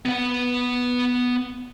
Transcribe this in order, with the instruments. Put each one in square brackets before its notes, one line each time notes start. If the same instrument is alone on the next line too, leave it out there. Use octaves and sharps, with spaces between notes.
[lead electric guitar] B3 F#5